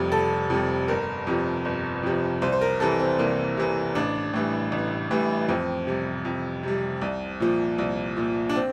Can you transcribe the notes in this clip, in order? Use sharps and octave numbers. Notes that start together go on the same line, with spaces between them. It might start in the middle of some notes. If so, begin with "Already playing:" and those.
Already playing: F1 F2 C3 G3
F1 A4
F2 C3 G3
G1 A#4
F2 C3 F3
G1
F2 C3 F3
C2 C5
C5
A#4
C3 E3 A4
C4
C2 A#3
C3 E3
A1 D4
A2 E3 G3
A1
A2 E3 G3
F2 C4
C3 G3
F2
C3 G3
C2
A#2 F3
C2
A#2 F3
D4
C4